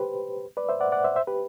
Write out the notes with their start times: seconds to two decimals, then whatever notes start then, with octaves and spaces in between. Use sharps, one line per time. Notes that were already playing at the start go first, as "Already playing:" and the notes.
Already playing: G4 B4 C5
0.57 B4 D5
0.69 C5 E5
0.80 D5 F#5
0.92 D5 F#5
1.04 C5 E5
1.16 C5 E5
1.27 G4 B4